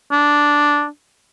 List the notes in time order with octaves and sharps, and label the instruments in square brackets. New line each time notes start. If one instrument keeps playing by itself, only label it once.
[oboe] D4